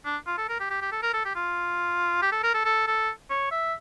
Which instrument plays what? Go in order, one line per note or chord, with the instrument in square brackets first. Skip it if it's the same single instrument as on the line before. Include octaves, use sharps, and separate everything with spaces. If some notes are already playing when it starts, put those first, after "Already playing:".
[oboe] D4
F4
A4
A#4
G4
G4
G4
A4
A#4
A4
G4
F4
G4
A4
A#4
A4
A4
A4
C#5
E5